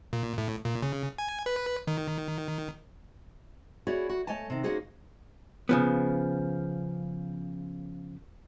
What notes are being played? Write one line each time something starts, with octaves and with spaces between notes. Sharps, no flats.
A#2
A2
A#2
C#3
G#5
B4
D#3
E4 F#4 G#4 C#5 D5
F#4
A3 C#5 D#5 G#5 A5
C3 D#3
A#3 C#4 D#4 F#4 G#4 C5
C#3 F3 B3